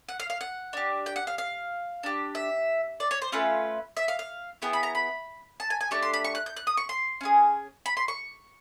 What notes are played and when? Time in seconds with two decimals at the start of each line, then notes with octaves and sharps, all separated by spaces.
0.09 F#5
0.20 F5
0.30 F5
0.41 F#5
0.73 D4 G4
1.06 G5
1.16 F#5
1.27 F5
1.38 F5
2.03 D4 G4
2.35 E5
3.00 D5
3.11 C#5
3.22 C5
3.32 A3 C#4 F4 B4
3.97 E5
4.08 F5
4.19 F5
4.62 B3 E4 G#4 G5
4.73 B5
4.83 A#5
4.95 B5
5.60 A5
5.70 G#5
5.81 G#5
5.91 A3 D4 G4 C#6
6.02 C6
6.14 B5
6.24 C#6
6.35 F#6
6.46 G6
6.56 F#6
6.67 D#6
6.77 C#6
6.89 C6
7.21 C#4 F4 G#4
7.86 B5
7.97 C6
8.08 C#6